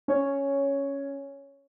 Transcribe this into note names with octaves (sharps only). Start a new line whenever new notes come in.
C#4 C#5